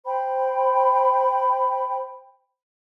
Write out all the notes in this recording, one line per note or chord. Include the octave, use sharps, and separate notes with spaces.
C5 G5 B5